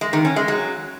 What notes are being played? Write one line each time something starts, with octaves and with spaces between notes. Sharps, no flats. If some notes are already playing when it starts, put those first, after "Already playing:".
G#3
D#3
C#4
G#3
F#3